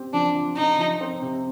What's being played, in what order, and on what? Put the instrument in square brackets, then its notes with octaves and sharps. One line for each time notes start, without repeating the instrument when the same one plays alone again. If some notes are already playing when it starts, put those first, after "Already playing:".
Already playing: [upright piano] C4 G4
[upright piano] F3 [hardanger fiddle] D4
[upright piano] F3
[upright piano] C3 [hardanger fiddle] D#4
[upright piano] F3
C4
C3